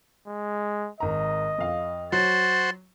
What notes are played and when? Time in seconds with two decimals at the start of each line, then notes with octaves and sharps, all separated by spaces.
0.27 G#3
1.00 G#1 D#5 A#5
1.58 F2 F5
2.12 F#3 F#4 C5 A6